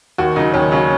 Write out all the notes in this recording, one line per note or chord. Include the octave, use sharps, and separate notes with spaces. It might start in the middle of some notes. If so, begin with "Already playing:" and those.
D#2 F#4
C#3 F#3 D#4
D#2 C#4
C#3 F#3 C#4